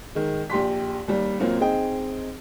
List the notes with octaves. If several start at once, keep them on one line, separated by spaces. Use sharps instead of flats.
D#3 G#3
A#1 G4 C6 B6
D#2 G3
F#2 A#2 A#3 C4 C#4
C4 D#4 G#4 D#5 G5